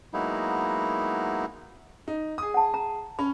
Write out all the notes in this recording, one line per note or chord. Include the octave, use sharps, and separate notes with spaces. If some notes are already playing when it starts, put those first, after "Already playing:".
F#3 G#3 A#3 B3 D#4 E4
D#4
G#4 D#6
F#5 A5
A#5
C#4 B5